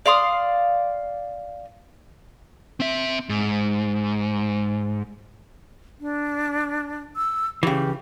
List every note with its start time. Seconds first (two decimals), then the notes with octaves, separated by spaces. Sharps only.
0.06 D5 F5 C6 D#6
2.80 C4 E5
3.29 G#2
6.00 D4
7.16 E6
7.63 C#3 E3 G4